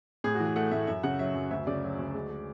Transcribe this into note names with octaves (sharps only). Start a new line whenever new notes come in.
A2 G#4
F#4
E3
G#4
A3 F#5
A2 E5
F#2 E5
C#3 F#5
F#3 E5
F#2
D2 E5
C#3 D5
F#3
D2
G#3
G#3